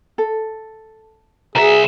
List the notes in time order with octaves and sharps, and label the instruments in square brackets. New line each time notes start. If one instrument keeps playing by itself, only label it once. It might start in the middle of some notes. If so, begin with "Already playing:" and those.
[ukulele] A4
[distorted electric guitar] C2 E5 [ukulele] F#4 B4 A#5 [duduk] G#4